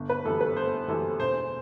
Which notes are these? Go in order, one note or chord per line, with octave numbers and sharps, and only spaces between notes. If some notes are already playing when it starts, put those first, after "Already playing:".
Already playing: G1
B4
F#2 E3 G3 A4
B4
G1 C5
F#2 E3 G3 A4
E1 C5